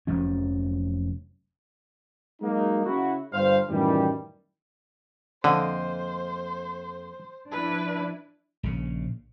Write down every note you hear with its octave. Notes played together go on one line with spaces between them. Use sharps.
F1 F3 F#3 C#4
F#3 G#3 A#3 D#4
C#3 E4 F#4
G1 G2 C5 F5
F#2 A2 D#3 E3 G3
F2 D3 A#3 C5 D#5
F3 D4 E4 B4
A#1 C#3